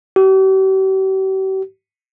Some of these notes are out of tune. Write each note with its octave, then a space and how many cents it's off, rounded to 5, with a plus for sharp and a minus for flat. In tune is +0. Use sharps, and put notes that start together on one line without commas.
G4 -45